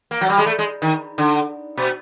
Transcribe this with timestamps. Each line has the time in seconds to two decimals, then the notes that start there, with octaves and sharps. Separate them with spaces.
0.11 A#3
0.21 F#3
0.29 G3
0.38 G#3
0.46 A3
0.58 G#3
0.82 D#3
1.18 D3
1.77 B2